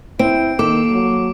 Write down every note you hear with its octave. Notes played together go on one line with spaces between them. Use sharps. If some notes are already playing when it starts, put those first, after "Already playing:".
C4 E4 D7
D#3 A#3 A4 D6
F#3